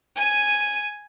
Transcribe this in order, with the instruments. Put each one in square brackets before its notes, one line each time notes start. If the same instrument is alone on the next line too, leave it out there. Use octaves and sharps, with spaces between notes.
[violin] G#5 D#7